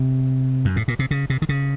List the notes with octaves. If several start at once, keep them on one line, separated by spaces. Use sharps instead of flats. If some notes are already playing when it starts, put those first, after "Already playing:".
Already playing: C3
F#2
A2
A#2
C3
C#3
C3
D#3
C#3